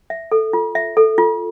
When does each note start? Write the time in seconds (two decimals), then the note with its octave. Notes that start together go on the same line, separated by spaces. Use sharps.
0.10 E5
0.32 A4
0.53 F4
0.75 E5
0.97 A4
1.18 F4